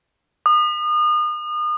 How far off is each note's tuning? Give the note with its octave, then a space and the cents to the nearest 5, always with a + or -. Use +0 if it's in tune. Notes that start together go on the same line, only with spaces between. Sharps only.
D#6 -35